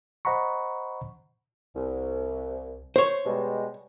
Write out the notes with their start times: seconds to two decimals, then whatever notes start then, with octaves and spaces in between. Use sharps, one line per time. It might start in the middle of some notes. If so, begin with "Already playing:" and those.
0.25 C5 D#5 F#5 A#5 B5 C#6
1.75 C2
2.96 C5 C#5
3.26 B2 G3 G#3